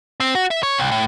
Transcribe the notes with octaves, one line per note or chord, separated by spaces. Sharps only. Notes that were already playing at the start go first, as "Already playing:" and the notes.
C4
F#4
E5
C#5
C2
A2